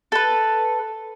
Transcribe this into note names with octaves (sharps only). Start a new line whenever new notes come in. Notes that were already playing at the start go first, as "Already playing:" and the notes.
A4 B4